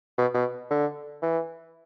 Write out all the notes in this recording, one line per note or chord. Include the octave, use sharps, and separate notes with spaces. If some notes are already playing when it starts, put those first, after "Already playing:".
B2
B2
D3
E3